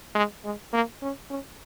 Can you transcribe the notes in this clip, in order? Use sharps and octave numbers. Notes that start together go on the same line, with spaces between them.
G#3
G#3
A#3
C#4
C#4